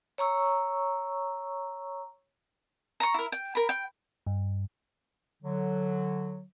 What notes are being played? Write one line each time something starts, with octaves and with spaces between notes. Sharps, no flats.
C#5 A#5 C#6 E6
A#5 C#6
E4 A#4
G5
A#4 B5
G5
G2
D3 F#3